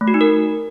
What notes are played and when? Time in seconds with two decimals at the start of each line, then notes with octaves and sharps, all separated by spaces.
0.01 A3
0.08 F#4
0.14 D#4
0.21 A#4